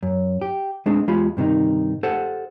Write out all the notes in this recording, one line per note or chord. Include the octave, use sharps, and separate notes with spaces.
F#2
G4
G#3 A3 C4 D4 G#4
E2 G#3 F4 G4 B5
G2 C3 D#3 D#4
G4 A4 C5 F#5